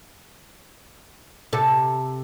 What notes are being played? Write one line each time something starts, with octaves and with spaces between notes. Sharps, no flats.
C3 A4